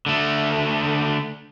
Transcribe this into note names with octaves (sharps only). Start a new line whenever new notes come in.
D3 A3